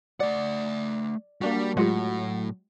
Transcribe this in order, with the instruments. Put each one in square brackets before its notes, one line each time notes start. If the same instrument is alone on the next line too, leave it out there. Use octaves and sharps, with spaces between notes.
[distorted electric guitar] A3 F#5 [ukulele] D5
[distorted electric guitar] G3 [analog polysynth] A#3 D4 F#4
[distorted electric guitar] A2 [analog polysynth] F#3 [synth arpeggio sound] G#3 F4 G4 [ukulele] F#5